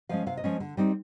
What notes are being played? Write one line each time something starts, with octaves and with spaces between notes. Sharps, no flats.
F3 G#3 C#4 F5
C3 F5
D#5
F3 G#3 C#4
D3
G3 C4 D#4